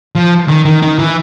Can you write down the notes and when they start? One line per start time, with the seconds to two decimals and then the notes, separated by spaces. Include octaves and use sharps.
0.15 F3
0.48 D#3
0.65 D#3
0.82 D#3
0.99 E3